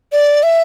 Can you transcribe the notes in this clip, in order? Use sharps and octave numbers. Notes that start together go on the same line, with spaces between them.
D5
E5